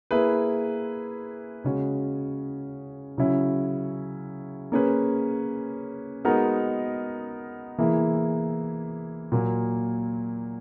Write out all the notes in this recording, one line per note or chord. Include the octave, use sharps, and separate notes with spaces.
A#3 E4 G#4 B4
C#3 G#3 C#4 F#4
C#3 F#3 C#4 E4
A#3 C#4 G#4 B4
G#3 B3 D#4 F#4 A#4
E3 A#3 E4 G#4
A#2 F#3 A#3